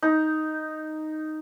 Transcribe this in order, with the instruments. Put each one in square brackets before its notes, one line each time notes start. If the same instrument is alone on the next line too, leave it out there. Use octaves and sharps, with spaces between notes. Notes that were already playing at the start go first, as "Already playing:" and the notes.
[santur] D#4